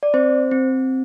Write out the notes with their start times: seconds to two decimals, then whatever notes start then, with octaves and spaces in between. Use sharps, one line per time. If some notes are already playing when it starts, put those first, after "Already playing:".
0.03 D5
0.14 C4 C5
0.51 C4